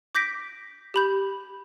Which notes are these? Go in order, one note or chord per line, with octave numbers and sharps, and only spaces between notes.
D6 G6 A#6 B6 D7
G4 B5 G6